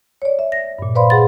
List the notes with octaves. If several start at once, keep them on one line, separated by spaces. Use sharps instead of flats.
C#5 D5
E5
A#6
G2 A#2
B4 C5 D5 F5 B5 C6
G#4 F#5 C6 A6